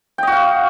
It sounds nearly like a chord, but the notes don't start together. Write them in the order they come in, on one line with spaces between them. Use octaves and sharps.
G5 D#5 F#4 F5